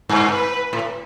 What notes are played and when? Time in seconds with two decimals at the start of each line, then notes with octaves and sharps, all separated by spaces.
0.09 G2
0.31 B4
0.73 A2